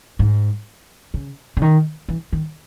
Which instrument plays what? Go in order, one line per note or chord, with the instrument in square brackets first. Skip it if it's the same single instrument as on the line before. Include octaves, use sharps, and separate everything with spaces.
[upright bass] G#2
C#3
C#3
D#3
E3
D#3